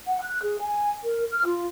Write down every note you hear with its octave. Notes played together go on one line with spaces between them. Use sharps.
F#5
F#6
G#4
G#5
A#4
F6
F4